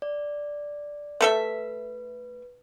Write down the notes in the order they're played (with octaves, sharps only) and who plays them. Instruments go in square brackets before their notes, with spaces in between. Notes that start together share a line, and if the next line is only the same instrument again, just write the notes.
[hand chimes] D5
[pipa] A3 A4 E5 [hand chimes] B4